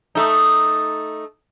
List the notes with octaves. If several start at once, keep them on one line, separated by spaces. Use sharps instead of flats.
A3 D#4